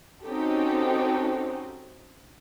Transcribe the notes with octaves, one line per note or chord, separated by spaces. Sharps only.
C4 C#4 D#4 F#4 G4 A4